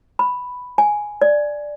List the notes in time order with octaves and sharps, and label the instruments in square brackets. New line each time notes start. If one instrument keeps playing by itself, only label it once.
[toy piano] B5
G#5
D5